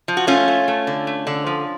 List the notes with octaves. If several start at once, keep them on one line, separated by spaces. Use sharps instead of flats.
F3
F#4
A3 C#4 F4
A3
A3
D3
A3
D3
F3